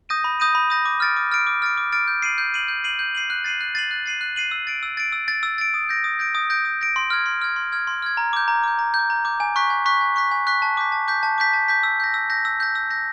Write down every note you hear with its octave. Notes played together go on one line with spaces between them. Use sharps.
D#6 G6 A#6 D#7
B5
D#6 G6 A#6 D#7
B5
D#6 G6 A#6 D#7
D6
F6 A6 D7
D6
F6 A6 D7
D6
F6 A6 D7
D6
F6 A6 D7
G6
C7 D#7 F#7
G6
C7 D#7 F#7
G6
C7 D#7 F#7
G6
C7 D#7 F#7
F#6
A6 C7 D#7 F#7
F#6
A6 C7 D#7 F#7
F#6
A6 C7 D#7 F#7
F#6
A6 C7 D#7 F#7
E6
A6 D7
E6
A6 D7
E6
A6
D7
E6
A6 D7
D#6
G6 A#6 D7
D#6
G6 A#6 D7
D#6
G6 A#6 D7
D#6
G6 A#6 D7
C6
F6 G#6
C6
F6 G#6
C6
F6 G#6
C6
F6 G#6
A#5
D6 G6
A#5
D6 G6
A#5
G6
D6
A#5
D6 G6
G#5
C#6 F#6 B6
G#5
C#6 F#6 B6
G#5
C#6 F#6 B6
G#5
C#6 F#6 B6
A5
D6 G6 B6
A5
D6 G6 B6
A5
D6 G6 B6
A5
D6 G6 B6
E6
G6 A#6
E6
G6 A#6
E6
G6 A#6
E6
G6 A#6